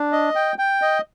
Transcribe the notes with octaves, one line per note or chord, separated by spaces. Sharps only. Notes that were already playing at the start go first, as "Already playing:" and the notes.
Already playing: D4
D#5
G5
G5
D#5